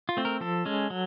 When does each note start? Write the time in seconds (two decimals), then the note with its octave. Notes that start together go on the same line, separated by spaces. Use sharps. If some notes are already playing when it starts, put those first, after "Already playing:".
0.09 F4
0.17 A3 C4
0.25 A#4
0.40 F3 A4
0.65 G#3 C#4
0.90 F#3